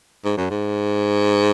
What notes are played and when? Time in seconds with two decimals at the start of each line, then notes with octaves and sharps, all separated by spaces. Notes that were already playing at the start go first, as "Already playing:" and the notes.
0.25 G#2
0.37 F#2
0.50 G#2